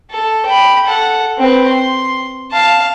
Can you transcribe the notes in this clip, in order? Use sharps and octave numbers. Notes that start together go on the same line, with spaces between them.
A4
G5 B5
A4 F#5
C4 B4
C6
F5 A5